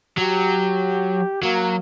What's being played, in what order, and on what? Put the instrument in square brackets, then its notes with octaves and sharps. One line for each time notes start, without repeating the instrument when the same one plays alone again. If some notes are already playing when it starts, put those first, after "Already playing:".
[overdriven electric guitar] F#3 [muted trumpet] G4
[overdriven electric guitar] F#3 [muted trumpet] A#3